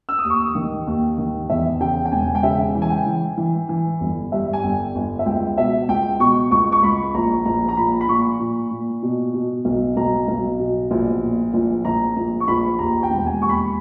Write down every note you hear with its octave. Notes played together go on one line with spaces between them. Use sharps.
E6
D#6
D#2
C#6
D#6
D#3
D#2
D#3
E2 E5
C#3 G5
G5
E1 G#5
G5
C#3 E5
E3
G#5
G5
E3
E3
E3
G1
G2 E5
G#5
G1 G5
G1
E5
C#2 G5
B2 E5
C#2 G5
B2 C#6
C#2 C#6
C#6
C#2 B5
A#1 A#5
A#1 A#5
A#5
A#2 B5
B5
A#2 C#6
A#2
A#2
B2
B2
B1
B1 A#5
B1
B2
A#1
A#2
A#1
A#1 A#5
A#1
C#6
A#1 B5
D#2 A#5
G5
E1
G5
G#5
D#2 C#6
B5